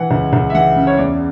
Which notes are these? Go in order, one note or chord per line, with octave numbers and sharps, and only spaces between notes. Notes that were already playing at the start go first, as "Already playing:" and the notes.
Already playing: E3 F#5
C#2
C#2
E5
E3 F#5
C#3
C#5
E2 D5